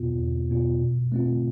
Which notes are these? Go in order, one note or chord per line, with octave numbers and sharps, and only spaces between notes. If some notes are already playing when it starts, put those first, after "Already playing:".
Already playing: E2 B2 B3 F4
E2
B2 B3 F4
B2
A3 C4 F4